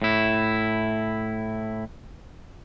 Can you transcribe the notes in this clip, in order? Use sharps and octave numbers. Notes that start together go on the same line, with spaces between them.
A2 E4